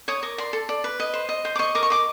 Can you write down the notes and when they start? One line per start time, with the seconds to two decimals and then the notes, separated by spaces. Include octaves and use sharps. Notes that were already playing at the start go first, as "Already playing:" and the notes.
0.08 C#5 D#6
0.23 A#4 D6
0.38 D5 C6
0.53 A4
0.69 D5
0.84 B4
1.00 D#5
1.14 C5
1.29 D#5
1.45 C5
1.56 D6
1.59 D#5 C#6
1.75 A#4 D6
1.83 C#6
1.90 D#5 D6